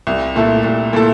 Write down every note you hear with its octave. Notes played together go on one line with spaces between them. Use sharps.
C2
A#2 A3 E4 A4
C2
A#2 A3 E4 A4